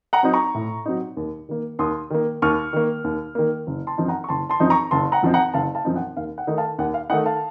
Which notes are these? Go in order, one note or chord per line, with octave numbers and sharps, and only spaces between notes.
F#5 A#5
F#3 C4 D#4
A#5 C#6
A2
F#3 C4 D#4
D#2
D#3 A#3
D#2 C6 D#6
D#3 A#3
D#2 C#6 F6
D#3 A#3
D#2
D#3 A#3
F#1
A5 C6
F#2 F3 C4 D#4
F#5 A#5
C#6
F#1 A5 C6
A5 C6
F#2 F3 C4 D#4
A#5 C#6
F#1 A5 C6
F#5 A#5
F#2 F3 C4 D#4
F#5 A#5
F#1 F5 A5
F5 A5
F#2 F3 C4 D#4
F#5
D#2 F5
F#5
D#3 A3 D#4
F5 A5
D#2 F#5
F5
D#3 A3 D#4 F#5
F5 A5